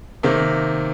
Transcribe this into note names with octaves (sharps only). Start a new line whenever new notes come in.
C3 D#3 A#3